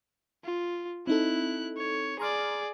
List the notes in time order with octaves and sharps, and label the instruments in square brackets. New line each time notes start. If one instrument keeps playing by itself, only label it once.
[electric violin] F4
[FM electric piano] C4 D#4 A4 [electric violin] E4 F#6
[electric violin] C#5
[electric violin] G#4 D5 [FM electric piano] A#5 C6 F6